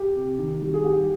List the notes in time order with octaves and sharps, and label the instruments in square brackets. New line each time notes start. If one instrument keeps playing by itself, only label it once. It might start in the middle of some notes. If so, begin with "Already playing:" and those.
Already playing: [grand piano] G4
C3
D#3
G3
G#4
G3 G4